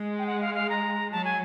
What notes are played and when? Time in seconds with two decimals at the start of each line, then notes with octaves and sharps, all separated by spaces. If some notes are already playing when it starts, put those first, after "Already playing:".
Already playing: G#3
0.19 G5
0.27 F#5
0.41 F5
0.55 F5
0.70 A#5
1.12 F#3 A5
1.25 G#5